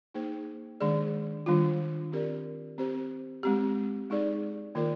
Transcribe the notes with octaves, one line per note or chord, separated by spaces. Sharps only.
A#3 D#4 G#4 C5
D#3 G#3 D4 G#4 D5
D#3 G3 D4 F4
C4 G4 A#4 D5
C4 G4 C5
G#3 C4 G4
G#3 D#4 G#4 D5
D#3 A#3 F4 A#4 D5